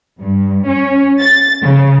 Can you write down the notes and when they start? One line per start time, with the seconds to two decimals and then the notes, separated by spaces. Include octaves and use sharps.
0.21 G2
0.68 C#4
1.21 A6
1.63 C#3